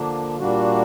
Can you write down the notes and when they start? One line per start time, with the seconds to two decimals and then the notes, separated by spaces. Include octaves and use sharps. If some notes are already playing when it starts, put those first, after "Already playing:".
Already playing: D3 F3 A#3 D4
0.40 A#2 G3 A#3 D4 F#4